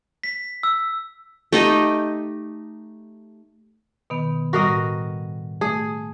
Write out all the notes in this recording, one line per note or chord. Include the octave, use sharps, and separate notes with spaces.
B6
E6
A3 D#4 G4 D#5
B2 D#3 B3
A2 G3 F#4 A#4 D#5
A3 G#4